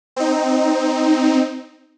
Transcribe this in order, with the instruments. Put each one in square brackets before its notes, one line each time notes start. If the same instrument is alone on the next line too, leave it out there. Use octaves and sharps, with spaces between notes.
[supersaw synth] C4 D#4